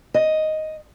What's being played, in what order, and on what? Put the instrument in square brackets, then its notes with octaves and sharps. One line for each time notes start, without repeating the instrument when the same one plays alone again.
[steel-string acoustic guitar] D#5